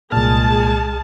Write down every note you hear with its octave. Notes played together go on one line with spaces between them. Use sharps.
C2 A#2 G#3 G#4 A5 F6